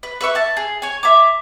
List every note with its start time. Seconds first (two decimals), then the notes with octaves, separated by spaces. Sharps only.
0.03 B4
0.21 B4 E5 C#6
0.35 E5 A5
0.57 G#4
0.82 C#5 G#5
1.03 E5 A#5 D6